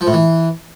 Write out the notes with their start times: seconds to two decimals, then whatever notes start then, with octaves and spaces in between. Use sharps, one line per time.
0.01 F3
0.07 A2
0.13 E3